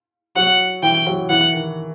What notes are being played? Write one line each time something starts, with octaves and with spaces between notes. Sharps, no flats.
F#3 F#5
E3 G5
F#3
E3 F#5
D#3